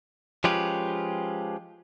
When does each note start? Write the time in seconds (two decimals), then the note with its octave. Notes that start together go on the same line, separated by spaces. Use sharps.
0.44 F3 G#3 C#4 F4 G4 B4